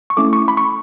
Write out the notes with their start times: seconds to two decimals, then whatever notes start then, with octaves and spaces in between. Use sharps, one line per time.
0.10 C#6
0.17 A3 C#4 E4 A4 D6
0.33 C#6
0.48 B5
0.57 C#6